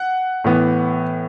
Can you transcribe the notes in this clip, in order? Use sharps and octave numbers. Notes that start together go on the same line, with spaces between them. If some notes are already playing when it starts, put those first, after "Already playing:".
Already playing: F#5
A2 E3 B3